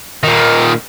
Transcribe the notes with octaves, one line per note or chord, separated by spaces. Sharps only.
A#2 D#3